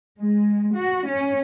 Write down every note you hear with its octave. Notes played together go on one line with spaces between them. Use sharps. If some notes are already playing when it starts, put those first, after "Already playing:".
G#3
F#4
C#4